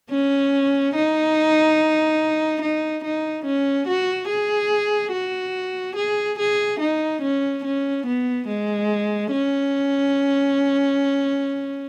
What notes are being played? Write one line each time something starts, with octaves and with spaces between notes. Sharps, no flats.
C#4
D#4
D#4
D#4
C#4
F#4
G#4
F#4
G#4
G#4
D#4
C#4
C#4
B3
G#3
C#4